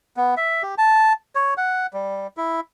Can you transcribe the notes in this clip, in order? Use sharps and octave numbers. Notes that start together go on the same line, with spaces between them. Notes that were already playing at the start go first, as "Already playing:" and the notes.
B3
E5
G4
A5
C#5
F#5
G3
E4